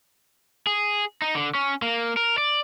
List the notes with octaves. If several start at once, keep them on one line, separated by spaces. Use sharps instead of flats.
G#4
D#4
D3
C#4
A#3
A#4
D5